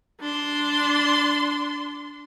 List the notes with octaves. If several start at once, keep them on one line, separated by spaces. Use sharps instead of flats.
D4 C6